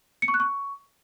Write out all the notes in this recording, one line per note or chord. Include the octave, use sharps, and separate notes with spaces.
C#7
C#6
F#6
C#6